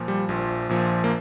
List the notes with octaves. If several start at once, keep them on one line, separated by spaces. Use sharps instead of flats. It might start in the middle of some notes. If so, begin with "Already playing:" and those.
Already playing: A#2 F3
G3
A#1 A#2 F3
A#1 A#2 F3
A#3